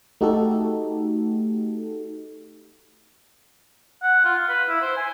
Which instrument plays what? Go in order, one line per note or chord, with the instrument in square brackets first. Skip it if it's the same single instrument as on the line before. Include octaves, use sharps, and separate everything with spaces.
[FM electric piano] A3 D#4 F#4 G4 A4
[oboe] F#5
F4
F5
B4
E4
C5
G#5